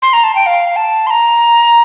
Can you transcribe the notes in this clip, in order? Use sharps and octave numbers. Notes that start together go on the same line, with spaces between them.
C6
A#5
A5
G5
F5
A5
C6
A#5